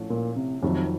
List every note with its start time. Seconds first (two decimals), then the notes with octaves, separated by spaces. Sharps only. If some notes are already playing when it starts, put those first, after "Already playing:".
Already playing: A#1 A2 A3 C#4
0.10 A#2
0.36 C3
0.62 F1 F2 C3 D#3 F#3